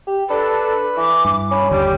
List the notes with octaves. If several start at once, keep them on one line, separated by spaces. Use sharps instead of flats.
G4
D4 A4 B4
E3 D6
G2
C#4 B5
G1 D#2 D3 G3 G4